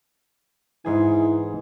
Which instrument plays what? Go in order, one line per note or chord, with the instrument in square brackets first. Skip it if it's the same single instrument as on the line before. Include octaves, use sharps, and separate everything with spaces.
[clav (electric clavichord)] G#2 G#4 G#5 [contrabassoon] E3